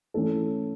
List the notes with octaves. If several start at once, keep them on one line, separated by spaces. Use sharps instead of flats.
E3 A3 C#4 A4